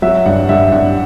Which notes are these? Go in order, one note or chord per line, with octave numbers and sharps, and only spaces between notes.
F#3 E5
G2 F#5
G2 E5
G2 F#5